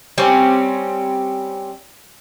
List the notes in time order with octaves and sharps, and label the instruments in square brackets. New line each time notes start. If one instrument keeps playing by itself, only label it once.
[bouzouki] G3 C4 C#4